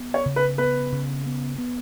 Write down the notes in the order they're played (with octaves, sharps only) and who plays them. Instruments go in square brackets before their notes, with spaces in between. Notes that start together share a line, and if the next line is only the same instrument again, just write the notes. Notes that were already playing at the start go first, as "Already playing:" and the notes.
Already playing: [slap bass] B3
[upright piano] C#5
[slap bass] C#3
[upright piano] B4
[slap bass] B3 [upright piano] B4
[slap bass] C#3
B3
B3